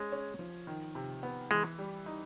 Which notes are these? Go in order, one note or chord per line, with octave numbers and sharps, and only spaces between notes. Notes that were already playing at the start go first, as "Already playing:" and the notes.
Already playing: G#3 C#4
C#4
F3
D#3
C3
B3
E3 G#3
G3
D#4